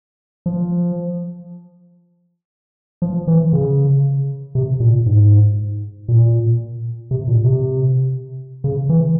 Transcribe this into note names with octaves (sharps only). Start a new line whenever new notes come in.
F3
F3
E3
C#3
C3
A#2
G#2
A#2
C3
A#2
C3
C#3
E3